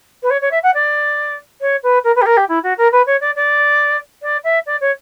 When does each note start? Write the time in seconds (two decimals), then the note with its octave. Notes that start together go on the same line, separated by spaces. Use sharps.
0.22 B4
0.30 C#5
0.41 C#5
0.51 E5
0.63 F#5
0.74 D5
1.61 C#5
1.83 B4
2.04 A#4
2.15 B4
2.21 G4
2.26 A#4
2.37 G4
2.48 E4
2.63 F#4
2.77 A#4
2.92 B4
3.06 C#5
3.20 D5
3.35 D5
4.22 D5
4.44 E5
4.66 D5
4.81 C#5